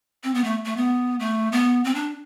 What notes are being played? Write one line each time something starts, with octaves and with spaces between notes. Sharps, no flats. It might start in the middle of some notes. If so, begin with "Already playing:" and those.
C4
B3
A3
A3
B3
A3
B3
C4
D4